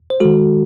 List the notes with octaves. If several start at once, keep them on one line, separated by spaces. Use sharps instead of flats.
C5
D#3 G#3 F#4 A4